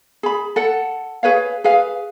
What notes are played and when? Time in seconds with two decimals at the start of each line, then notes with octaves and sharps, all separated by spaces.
0.23 G#4 B5
0.56 A4 F#5
1.23 G#4 B4 C#5 F5
1.64 G#4 B4 F5